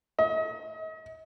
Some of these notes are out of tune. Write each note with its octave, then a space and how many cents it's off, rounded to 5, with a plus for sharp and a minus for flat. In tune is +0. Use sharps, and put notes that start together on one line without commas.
D#5 +40